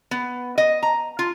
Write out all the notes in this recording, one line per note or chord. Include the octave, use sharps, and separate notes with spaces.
B3
D#5
A#5
F4